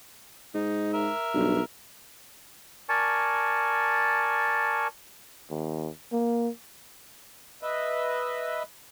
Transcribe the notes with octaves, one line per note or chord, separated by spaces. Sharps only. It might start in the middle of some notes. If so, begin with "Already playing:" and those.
G#2 D#4
A#4 E5
B1 G2
A#4 D5 G#5 A5 C#6
D#2
A#3
B4 D#5 E5